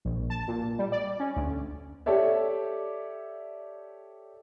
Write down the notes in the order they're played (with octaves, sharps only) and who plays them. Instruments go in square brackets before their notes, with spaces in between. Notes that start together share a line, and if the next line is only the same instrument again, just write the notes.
[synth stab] A#1
A5
A#2
G3
D5
C#4
D2
[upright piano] G4 A4 C#5 D5 E5